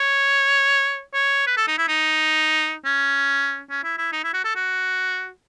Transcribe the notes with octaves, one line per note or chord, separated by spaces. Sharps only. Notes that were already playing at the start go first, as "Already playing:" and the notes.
Already playing: C#5
C#5
B4
A4
D#4
E4
D#4
C#4
C#4
E4
E4
D#4
E4
F#4
A4
F#4